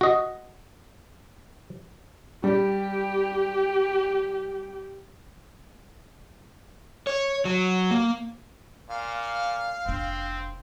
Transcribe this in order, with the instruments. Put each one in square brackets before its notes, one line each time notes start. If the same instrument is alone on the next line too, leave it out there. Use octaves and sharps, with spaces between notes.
[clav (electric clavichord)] F#4 D#5
[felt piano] G3 [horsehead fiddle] G4
[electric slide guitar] C#5
F#3
A#3
[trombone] A#2 [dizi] F5
[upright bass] F1 D4 [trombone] C4